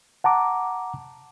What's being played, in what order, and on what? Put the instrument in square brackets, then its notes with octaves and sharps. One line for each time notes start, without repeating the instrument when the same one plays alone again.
[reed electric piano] F#5 A5 A#5 D6